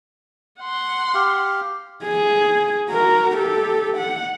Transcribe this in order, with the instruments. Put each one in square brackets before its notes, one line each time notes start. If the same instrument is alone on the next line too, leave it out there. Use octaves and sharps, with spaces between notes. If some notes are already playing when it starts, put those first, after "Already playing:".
[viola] F#5 C6
[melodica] G4 F5
[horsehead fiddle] G#4
F#4 A#4
G4 A4
F#5